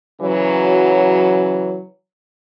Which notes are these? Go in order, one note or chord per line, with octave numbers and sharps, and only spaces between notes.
C#3 E3 F#3